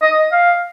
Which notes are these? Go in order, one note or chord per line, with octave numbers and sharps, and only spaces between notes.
D#5
F5